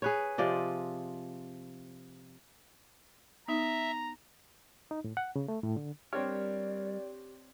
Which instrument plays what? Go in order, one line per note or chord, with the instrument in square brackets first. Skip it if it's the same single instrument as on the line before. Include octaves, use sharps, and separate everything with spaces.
[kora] G#4 B4 C#5
C3 F3 D5 D#5
[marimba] B3 D#4 [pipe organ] E5 [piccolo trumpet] A#5
[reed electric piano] D#4
A2
F#5
C#3
A3
A2
D3
[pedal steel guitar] G3 A#4 F6 [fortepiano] C4 D4 C#5 [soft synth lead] G4 [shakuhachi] D5